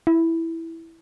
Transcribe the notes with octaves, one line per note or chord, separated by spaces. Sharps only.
E4